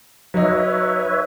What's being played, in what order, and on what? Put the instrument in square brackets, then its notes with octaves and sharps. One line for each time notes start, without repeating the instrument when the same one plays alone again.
[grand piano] F#3 D#4 [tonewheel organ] B4 C#5 E5